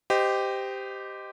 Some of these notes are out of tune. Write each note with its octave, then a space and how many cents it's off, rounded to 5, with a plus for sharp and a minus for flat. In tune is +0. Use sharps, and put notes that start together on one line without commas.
G4 +0 C5 -25 D#5 -5